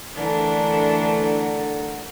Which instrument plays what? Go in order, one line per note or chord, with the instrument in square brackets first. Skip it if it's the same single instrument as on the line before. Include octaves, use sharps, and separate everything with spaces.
[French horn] D3 [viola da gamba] E3 A3 [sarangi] D4 [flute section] A#4 D5 F#5